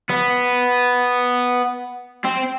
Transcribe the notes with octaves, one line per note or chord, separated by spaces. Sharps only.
B3
C4